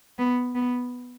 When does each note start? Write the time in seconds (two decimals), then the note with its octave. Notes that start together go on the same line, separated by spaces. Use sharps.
0.18 B3
0.55 B3